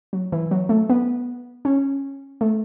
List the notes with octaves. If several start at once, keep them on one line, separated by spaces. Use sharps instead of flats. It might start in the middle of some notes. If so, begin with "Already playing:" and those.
F#3
E3
F#3
A3
B3
C#4
A3